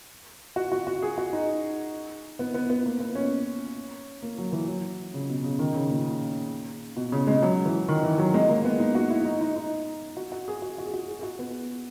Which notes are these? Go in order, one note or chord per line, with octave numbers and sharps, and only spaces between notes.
F#4
F#4
F#4
G#4
F#4
D#4
B3
B3
B3
A#3
B3
C#4
A#3
F#3
E3
F#3
C#3
B2
C#3
D#3
C#3
A#2
B2
C#3
G#3
F#3
E3
D#3
E3
F#3
G#3
A#3
B3
D#4
F#4
E4
D#4
D#4
D#4
F#4
F#4
G#4
F#4
F#4
G#4
F#4
G#4
G#4
F#4
B3